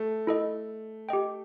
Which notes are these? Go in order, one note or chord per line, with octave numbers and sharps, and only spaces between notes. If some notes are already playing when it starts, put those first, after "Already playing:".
Already playing: A3
E4 A4 D#5
G4 D#5 G5